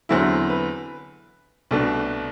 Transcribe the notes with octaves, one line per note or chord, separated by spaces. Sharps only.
E2 D3 F#3 C4 E4
B4
C2 B2 A3 D4